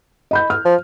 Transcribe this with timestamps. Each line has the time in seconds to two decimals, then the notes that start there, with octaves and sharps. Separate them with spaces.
0.31 D#5 B5 G6
0.50 F6
0.65 F3